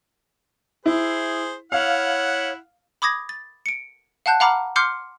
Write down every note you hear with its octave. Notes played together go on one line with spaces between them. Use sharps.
E4 G#4 C5
E4 C#5 F5 F#5
B5 D6 D#6 G#6 A#6
A6
C#7 D7
F5 F#5 A5 F#6 G6
F5 F#5 A#5 B5 D6 F6
C6 D6 F6 G6 C7 C#7